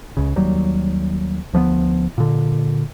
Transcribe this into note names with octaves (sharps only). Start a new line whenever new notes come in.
C#2 C#3
D#2 F#3 G3
D2 F3 G#3 B3
A#2 D3